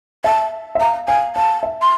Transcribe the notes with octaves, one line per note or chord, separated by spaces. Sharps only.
E5 A5
E5
F5 A#5
F5 G#5
F5 A5
E5
C6